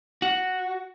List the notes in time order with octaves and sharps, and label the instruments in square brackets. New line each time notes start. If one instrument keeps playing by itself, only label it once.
[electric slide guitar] F#4